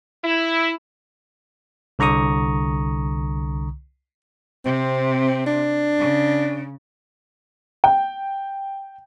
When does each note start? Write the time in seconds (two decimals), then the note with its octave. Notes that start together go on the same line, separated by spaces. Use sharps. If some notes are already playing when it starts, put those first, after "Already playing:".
0.24 E4
1.99 C2 D3 A#5 C#6 D#6
4.65 C3 C4
5.46 D4
5.99 C#3
7.84 G5